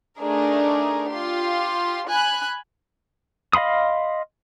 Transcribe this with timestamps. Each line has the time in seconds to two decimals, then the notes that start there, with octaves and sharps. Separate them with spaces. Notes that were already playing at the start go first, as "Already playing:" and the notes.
0.18 A3 D4 D#4 G#4 A#4
1.11 F4 G4 C6
2.08 G#5 B5 F#6
3.53 D#5 F5 B5 C6 D#6